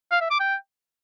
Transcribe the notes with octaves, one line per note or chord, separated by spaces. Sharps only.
F5
E5
D6
G5